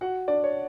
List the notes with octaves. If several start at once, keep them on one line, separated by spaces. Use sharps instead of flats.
F#4 F#5
D4 D5
C#5